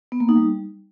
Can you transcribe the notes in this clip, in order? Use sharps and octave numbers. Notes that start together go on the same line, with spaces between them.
B3
A#3
D#4
G3